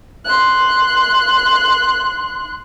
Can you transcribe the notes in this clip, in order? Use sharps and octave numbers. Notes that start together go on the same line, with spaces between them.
C6 F#6